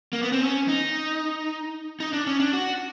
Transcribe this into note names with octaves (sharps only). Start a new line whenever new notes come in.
A#3
B3
C4
C#4
D#4
D#4
D4
C#4
D4
F#4